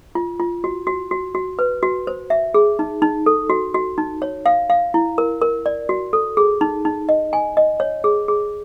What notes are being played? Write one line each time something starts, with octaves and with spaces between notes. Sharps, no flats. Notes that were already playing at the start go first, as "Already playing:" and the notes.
F4
F4
F#4
F#4
F#4
F#4
B4
F#4
C5
E5
G#4
D#4
D#4
A4
F#4
F#4
D#4
C#5
F5
F5
E4
A#4
A#4
D5
F#4
A4
G#4
D#4
D#4
D#5
G#5
D#5
C#5
G#4
G#4